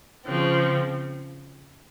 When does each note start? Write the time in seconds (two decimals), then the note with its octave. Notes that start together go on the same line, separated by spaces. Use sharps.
0.25 C#3 F3 C4